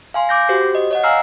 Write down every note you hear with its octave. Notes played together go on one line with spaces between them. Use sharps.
F5 G#5 C6
D6 G6 A#6
F#4 G4 C5
D#5
C#5 D#5 F#5
F5 G#5 A#5 E6 F6 C7